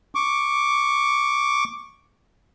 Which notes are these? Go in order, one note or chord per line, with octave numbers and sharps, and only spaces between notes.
C#6 D6